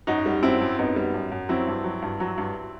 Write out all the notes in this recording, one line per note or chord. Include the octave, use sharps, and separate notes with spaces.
F#2 D#4 F#4
G3
F#2 C4 E4
F#2
F#2 B3 D#4
G3
F#2
F#2
F#3 C4 E4
G2
F#3
G2
F#3
G2